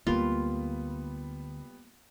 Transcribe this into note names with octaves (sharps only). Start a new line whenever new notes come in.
D2 D3 G3 A#3 B3 F4